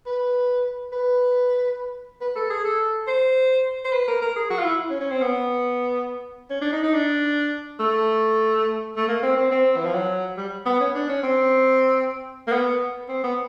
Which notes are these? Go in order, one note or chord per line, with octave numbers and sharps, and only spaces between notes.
B4
B4
B4
A4
G#4
A4
C5
C5
B4
A#4
A#4
G#4
F#4
F4
E4
C#4
C#4
C4
B3
C#4
D4
D#4
D#4
D4
A3
A3
A#3
C4
C4
C4
E3
F3
F#3
G3
B3
C#4
D4
C#4
C4
A#3
B3
C4
B3